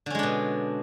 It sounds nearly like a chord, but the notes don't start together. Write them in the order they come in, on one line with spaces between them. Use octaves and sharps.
D3 C#4 G#3 D4 B2